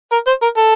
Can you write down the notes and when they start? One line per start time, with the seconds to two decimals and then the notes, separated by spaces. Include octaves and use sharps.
0.12 A#4
0.27 C5
0.42 A#4
0.57 A4